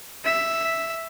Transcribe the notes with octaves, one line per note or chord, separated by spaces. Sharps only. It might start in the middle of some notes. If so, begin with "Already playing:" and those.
E5